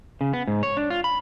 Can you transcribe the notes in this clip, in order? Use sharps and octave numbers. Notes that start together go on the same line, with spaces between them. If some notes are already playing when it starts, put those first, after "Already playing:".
C#3
B3
G#2
C#5
D4
F4
B5